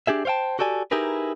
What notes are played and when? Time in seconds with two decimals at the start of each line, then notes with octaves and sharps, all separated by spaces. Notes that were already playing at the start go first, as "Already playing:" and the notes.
0.07 D4 G4 G#4 E5
0.25 C5 C#5 F5 G5 A5
0.59 F#4 G4 A4 D5 G#5
0.91 D#4 E4 G4 G#4 A#4 B4